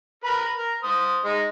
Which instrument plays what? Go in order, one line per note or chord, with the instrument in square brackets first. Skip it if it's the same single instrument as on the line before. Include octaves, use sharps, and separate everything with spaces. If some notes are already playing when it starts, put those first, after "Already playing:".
[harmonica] A#4 B4 B5
A#4
C5 D#6
G#3 D#4